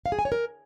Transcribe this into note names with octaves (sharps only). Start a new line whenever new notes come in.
F5
G#4
G#5
C#5
A#4